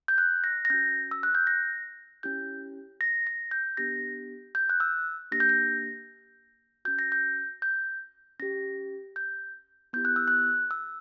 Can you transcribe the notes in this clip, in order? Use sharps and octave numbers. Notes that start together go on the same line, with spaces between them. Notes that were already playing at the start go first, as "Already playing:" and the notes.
G6
F#6
A#6
A#6
C#4 F#4 G6
E6
F#6
G6
A#6
C#4 E4 G4 G6
A#6
A#6
G6
B3 D4 G4 A#6
G6
F#6
E6
A#3 D4 G4 A#6
G6
A#6
C#4 F#4 G6
A#6
G6
G6
C#4 G4 A#6
G6
B3 E4 G4 G6
F#6
E6
F#6
E6